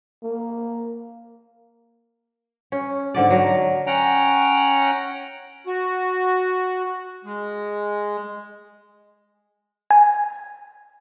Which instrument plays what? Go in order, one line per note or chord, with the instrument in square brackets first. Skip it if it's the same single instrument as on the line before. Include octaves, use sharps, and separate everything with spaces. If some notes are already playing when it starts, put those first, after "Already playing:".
[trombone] A#3
[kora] C#4
G#2 D3 D5
F#3 A#4
[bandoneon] C#4 F#5 G5 A#5
[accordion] F#4
G#3
[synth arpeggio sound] G#5